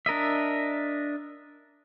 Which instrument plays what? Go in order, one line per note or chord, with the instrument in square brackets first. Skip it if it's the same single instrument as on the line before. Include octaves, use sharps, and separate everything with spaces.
[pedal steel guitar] D4 A#4 D#5 E5